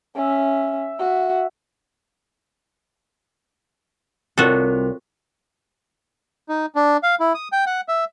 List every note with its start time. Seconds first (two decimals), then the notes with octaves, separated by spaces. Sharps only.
0.16 C#4 E5
0.99 F#4
4.38 C2 C4 F4 F#4 A4 A#4 C#5
6.49 D#4
6.75 D4
7.03 F5
7.20 E4
7.34 D#6
7.52 G5
7.66 F#5
7.88 E5